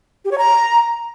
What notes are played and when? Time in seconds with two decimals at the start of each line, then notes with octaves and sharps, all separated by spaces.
0.25 G4
0.31 C#5
0.38 A#5